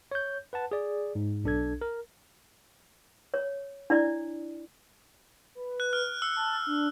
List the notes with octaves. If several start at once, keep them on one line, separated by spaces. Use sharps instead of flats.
C#5 G6
B4 F#5 A5
G#4 D5
G#2
B1 D4 A4 G#6
A#4
C#5
D4 E4 D5
B4
F#6
F6
E6 C#7
A5
D4